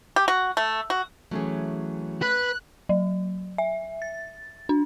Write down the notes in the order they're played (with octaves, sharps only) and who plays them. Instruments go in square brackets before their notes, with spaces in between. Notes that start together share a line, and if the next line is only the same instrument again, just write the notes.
[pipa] G4
F#4
A3
F#4
[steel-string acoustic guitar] E3 F#3 [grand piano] A3 C#4 G#4
[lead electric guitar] B4 [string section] F#6
[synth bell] F#3
E5
A6
D4